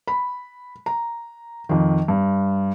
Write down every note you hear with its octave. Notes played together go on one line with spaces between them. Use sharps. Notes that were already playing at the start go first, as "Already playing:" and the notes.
B5
A#5
F2 D#3
G2